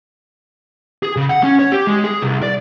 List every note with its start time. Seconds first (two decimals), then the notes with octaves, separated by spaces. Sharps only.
1.03 G#4
1.16 C#3
1.29 F#5
1.43 C#4
1.59 C#5
1.72 G4
1.87 G#3
2.04 G#4
2.22 C2
2.42 D5